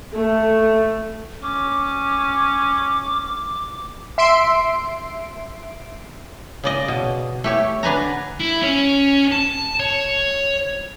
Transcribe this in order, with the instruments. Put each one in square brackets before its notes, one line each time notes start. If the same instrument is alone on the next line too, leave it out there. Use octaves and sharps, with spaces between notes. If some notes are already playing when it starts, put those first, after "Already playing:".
[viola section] A3
[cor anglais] C#4 [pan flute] D6
[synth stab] E5 C6 C7 D7
[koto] C#3 D5 D#5
B2
A3 G4 C#5
D3 D4 B4 G#5 A#5
[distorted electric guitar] E4
C#4
A5
C#5